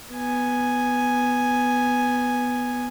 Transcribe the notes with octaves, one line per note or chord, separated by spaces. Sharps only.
B3 G#5